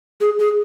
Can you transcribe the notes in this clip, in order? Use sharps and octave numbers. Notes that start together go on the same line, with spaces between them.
G#4
G#4